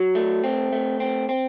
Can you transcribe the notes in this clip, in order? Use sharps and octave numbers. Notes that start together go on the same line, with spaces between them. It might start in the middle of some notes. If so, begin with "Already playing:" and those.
Already playing: F#3
A3
C4
A3
C4
C4